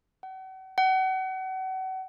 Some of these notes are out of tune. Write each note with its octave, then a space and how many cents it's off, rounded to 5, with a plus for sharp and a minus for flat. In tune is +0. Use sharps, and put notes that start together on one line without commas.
F#5 +40
F#5 +35